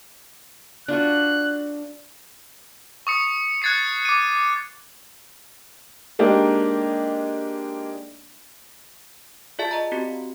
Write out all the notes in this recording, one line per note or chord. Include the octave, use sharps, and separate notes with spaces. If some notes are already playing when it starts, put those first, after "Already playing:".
D4 F4 F#4 F#6
C#6 D#6 C#7
F#6 G#6 A6 C7 C#7
D6 D#7
G#3 A#3 D4 D#4 G4
F4 G#4 D5 E5 A5 A6
D#5 A#5
C4 F#4 G4